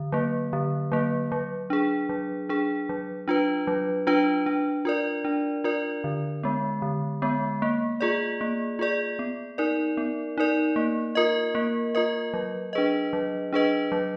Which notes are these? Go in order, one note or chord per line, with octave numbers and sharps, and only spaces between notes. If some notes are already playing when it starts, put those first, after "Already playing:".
Already playing: D3
F#3 A#3
D3
F#3 A#3
F#3
D4 G#4
F#3
D4 G#4
F#3
D4 F4 B4
F#3
D4 F4 B4
D4
F4 A#4 D5
D4
F4 A#4 D5
D3
G#3 B3
D3
G#3 B3
A#3
F4 G#4 D5
A#3
F4 G#4 D5
B3
D#4 A#4 D5
B3
D#4 A#4 D5
A#3
F4 A#4 D#5
A#3
F4 A#4 D#5
F#3
D4 G#4 B4 D#5
F#3
D4 G#4 B4 D#5
F#3